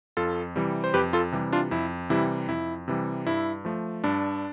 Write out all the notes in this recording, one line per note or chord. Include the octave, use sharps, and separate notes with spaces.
F2 F4 A4
C3 E3 G3
C5
F2 G4 B4
F4 A4
C3 E3 G3
D4 F4
F2 E4
C3 E3 G3 E4
F2 E4
C3 E3 G3
G2 E4
F3 A3
G2 D4